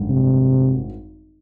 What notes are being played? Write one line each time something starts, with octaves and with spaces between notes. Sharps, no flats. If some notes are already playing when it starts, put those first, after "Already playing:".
Already playing: G#1 F#2 D3 G3
C3